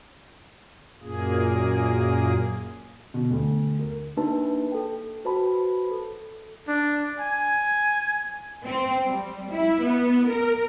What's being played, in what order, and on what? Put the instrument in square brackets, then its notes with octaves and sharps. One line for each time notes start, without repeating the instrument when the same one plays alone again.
[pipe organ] F#2 A#2 A#3 G#4
[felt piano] B2
D2
A#4
[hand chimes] A#3 D4 D#4 G4 B4 A5
A4 G5
F#4 B4 C5 A5 B5
A4
[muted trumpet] D4
G#5
[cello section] C4
G3
E4
B3
A#4